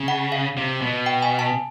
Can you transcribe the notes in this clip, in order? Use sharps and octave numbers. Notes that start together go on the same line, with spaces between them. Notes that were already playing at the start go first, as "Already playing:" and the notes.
Already playing: C#3
F#5
F5
C3
B2
G5
G#5
A5